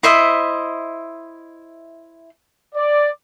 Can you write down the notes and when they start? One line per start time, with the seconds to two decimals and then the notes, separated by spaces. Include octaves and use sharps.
0.03 E4 C5 D#5 E5
2.75 D5